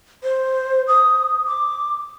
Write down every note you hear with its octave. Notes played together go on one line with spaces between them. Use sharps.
C5
D#6
D6